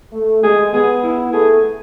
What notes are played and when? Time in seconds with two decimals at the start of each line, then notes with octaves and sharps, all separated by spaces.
0.14 A3
0.44 G#3 G#4
0.73 B3 G#4
1.03 E4
1.33 A3 G#4